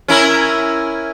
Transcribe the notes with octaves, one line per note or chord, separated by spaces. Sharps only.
C#4 E4 A#4